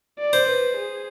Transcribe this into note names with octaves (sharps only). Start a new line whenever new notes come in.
D5
C5
B4
G#4